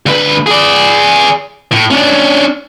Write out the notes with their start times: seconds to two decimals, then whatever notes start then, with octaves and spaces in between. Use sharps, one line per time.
0.06 D2 B4
0.46 G#4 D5
1.72 A2
1.91 C#4 D4